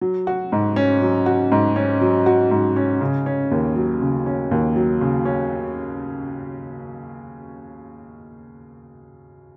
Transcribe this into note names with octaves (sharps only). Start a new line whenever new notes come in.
F#3
F#4
G#2
C#4
F#3
F#4
G#2
C#4
F#3
F#4
G#2
C#4
C#3
C#4
D#2
F#3
C#3
C#4
D#2
F#3
C#3
C#4